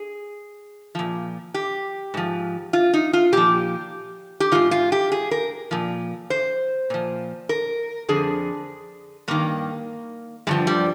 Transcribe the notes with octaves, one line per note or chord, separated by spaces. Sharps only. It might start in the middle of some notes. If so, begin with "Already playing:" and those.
Already playing: G#4
A#2 F3
G4
G#2 F3
F4
D#4
F4
A#2 F3 G4
G4
G#2 D#3 F4
F4
G4
G#4
A#4
A#2 F3
C5
A#2 F3
A#4
F2 D3 F3 G#4
G2 D#3 A#3
G2 D3 F3 G#3
G3